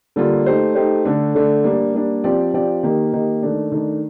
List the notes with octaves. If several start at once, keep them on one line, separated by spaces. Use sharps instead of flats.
D3 G3 A#3 F4
A3 D#4 G4 C5
A3 D#4 G4 C5
D3 A3 D4
D3 A3 D4
G3 A#3 D4
G3 A#3 D4
F3 C4 G4 D5
F3 C4 G4 D5
D#3 A#3 D#4 G4
D#3 A#3 D#4 G4
D#3 A3 D4
D#3 A3 D4